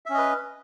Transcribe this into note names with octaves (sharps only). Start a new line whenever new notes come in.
C#4 B4 D#5 E5